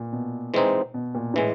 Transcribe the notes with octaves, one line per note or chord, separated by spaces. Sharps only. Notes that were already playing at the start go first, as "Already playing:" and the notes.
Already playing: A#2
B2
E3 G#3 C4 D#4
B2
A#2
A2 E3 G#3